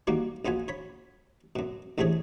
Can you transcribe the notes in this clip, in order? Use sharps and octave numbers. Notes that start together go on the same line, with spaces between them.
D#3 G3 A#3 F#4
A#1 B3 F4 F#4 G#5
C#5 B5
F#2 B2
A1 E2 C3 A3 G#4 C#5